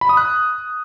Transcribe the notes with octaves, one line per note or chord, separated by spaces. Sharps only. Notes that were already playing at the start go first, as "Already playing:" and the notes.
B5
D#6
F#6